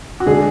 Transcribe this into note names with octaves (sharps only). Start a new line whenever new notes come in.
F#4
D3 G#3 D4 G#4